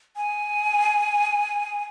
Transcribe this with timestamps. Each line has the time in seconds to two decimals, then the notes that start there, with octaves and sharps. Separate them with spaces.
0.17 G#5